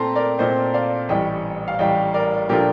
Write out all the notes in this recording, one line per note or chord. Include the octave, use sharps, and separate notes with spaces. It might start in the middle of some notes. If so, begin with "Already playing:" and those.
Already playing: A#2 A3 C4 G5 A5 A#5 C6
A#4 D5
A#2 A3 C4 C5 D#5
D5 F5
A1 A2 G3 D#5 G5
F5
A1 A2 G3 D#5 G5
A#4 D5
A#2 F3 A3 D4 F4 G4 A#4